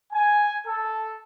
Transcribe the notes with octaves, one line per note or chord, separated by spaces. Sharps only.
G#5
A4